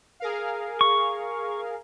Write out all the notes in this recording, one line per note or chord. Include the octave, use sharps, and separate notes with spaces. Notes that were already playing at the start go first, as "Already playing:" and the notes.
G#4 A#4 F5
C#6